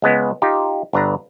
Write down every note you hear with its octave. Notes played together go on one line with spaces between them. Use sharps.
C#2 G#3 B3
D#4 F4 G4
G1 D4 B4 A#5